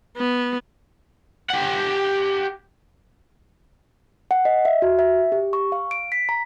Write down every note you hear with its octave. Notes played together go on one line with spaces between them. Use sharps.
B3
G4 F#5
F#5
D#5
E5
F#4
E5
G4
C#6
F5
D7
B6
A#5